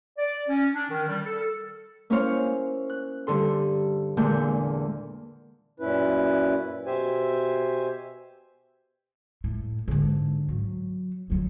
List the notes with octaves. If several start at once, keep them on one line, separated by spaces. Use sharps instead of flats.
D5
C#4
D4
D#3
G3
A4
A#3 C#4 E4 C5 C#5 F5
F#6
G2 D3 A4 C6
E2 A#2 D3 G#3 A#3 G6
F#2 A#2 C#4 E4 B4
B2 G4 C5 E5 G#5
A2
G#2 D3
F#3
G1 F#3